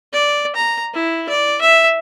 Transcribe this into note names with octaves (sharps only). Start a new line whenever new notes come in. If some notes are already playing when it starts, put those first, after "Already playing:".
D5
A#5
E4
D5
E5